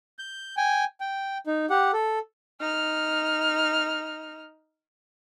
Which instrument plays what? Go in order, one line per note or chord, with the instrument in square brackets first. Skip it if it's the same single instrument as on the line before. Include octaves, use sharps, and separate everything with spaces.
[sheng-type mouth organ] G6
G5 G#5
G5
D#4
G4 F#5
A4
[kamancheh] D#4 F6